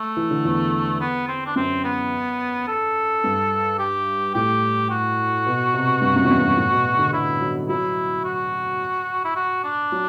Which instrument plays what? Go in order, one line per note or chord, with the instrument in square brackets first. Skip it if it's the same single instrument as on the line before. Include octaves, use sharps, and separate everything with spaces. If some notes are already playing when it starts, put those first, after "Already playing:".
Already playing: [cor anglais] A3
[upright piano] E3
D3
E2
[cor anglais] B3
C4
D4
[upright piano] F#2 [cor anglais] C4
[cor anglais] B3
A4
[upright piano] G2
[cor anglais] G4
[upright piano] A2 [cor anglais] G4
[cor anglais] F#4
[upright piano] B2
C3
G2
F#2
E2
F#2
G2
A2
B2
D3
[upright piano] D3 [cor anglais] E4
[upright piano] F#3
[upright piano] F#3 [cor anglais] E4
[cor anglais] F#4
E4
F#4
D4
[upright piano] F#3